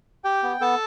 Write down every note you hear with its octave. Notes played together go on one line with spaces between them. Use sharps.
G4 G5
B3
B3 A4 A5